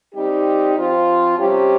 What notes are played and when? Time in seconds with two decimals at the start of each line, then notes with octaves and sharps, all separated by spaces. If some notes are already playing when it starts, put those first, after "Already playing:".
0.14 G3 C4 D#4 G4
0.76 F3 C4 F4
1.37 C3 G3 C#4 G4